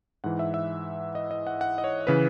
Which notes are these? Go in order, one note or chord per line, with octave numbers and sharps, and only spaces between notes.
G#2 E3 F#5
E5
E5
D#5
D#5
F#5
F#5
D#5
C#5
C#3 E3 B4